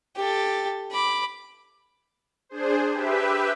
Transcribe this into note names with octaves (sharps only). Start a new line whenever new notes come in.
G4 A4
B5 D6
D4 G#4 C5
G4 B4 E5